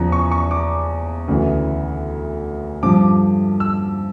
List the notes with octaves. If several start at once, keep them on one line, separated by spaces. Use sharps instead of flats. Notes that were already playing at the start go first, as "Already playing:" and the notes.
Already playing: E2 C#3 F3 A#5
C#6
C#6
D6
D2 C#3 E3
G2 F3 D6
E6